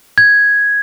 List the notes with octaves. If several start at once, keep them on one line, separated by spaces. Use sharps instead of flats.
G#6